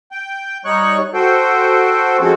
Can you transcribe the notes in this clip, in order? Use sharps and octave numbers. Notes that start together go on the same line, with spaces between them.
G5
G3 D#4 C#5 C#6 F#6
F#4 A4 C5 G5
F3 G#3 C4 C#4 F#4 A4